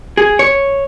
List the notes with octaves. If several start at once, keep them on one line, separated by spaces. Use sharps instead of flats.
G#4
C#5